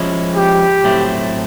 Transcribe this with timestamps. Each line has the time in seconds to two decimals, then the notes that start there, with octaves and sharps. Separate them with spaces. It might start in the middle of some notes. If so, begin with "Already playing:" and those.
Already playing: F3 G#3 C#4 E4
0.36 G4
0.84 A2 F#3 A3 C4 E4